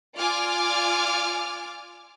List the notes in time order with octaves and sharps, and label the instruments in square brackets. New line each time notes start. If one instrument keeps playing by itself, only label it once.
[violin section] F4 D5 G#5 D6 F6